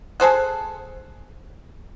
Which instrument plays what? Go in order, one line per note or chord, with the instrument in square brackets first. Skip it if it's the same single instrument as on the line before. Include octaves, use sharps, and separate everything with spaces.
[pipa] G#4 A4 C5 F#5